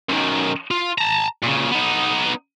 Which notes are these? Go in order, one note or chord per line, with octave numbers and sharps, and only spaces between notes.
F#2 D#3
F4
A5 A#5
A#2 C#3
B3 D#4